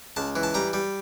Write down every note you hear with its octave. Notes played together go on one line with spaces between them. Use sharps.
C#2 A5
E3
A5
G3 A#5
G3